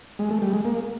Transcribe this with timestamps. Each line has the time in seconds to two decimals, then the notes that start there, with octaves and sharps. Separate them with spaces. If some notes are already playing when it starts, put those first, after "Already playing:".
0.19 G#3
0.31 A3
0.42 G3
0.53 G#3
0.65 A#3